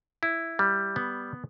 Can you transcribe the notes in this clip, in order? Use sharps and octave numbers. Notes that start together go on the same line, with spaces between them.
E4
G3
B3